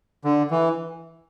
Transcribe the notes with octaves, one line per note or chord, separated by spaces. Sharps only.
D3
E3